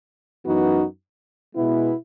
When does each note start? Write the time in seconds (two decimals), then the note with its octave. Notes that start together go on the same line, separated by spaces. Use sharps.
0.45 F#2 E3 B3 D#4 F#4
1.55 B2 G#3 B3 E4